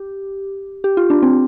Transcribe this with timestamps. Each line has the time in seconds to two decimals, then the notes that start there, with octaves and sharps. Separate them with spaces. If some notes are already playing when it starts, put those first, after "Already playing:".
Already playing: G4
0.84 G4
0.97 F4
1.10 D4
1.23 C4